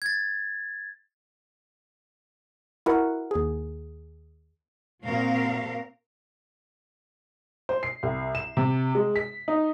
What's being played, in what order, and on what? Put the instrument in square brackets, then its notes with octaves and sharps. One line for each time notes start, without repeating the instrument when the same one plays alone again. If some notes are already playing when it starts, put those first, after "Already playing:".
[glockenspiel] G#6 A6
[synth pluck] E4 F#4 A#4 B4 F#5
D#2 G#4
[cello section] A#2 C4 F#4 A#4 F5
[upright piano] C5
C7
C2
E7
C3
G#3
B6
D#4